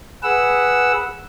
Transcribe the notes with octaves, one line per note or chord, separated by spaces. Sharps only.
G#4 B4 F#5 E6